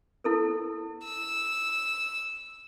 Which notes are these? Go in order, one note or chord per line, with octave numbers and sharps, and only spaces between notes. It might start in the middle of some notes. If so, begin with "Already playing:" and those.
E4 A4 A#4
E6